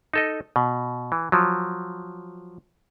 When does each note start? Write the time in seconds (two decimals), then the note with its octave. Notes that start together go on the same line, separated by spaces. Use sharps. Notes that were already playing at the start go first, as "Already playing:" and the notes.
0.14 D#4 A4 D#5
0.56 B2
1.12 E3
1.32 F3 F#3